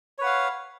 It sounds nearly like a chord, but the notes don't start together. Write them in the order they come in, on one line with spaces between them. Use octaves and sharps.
C#5 B4 F#5 F5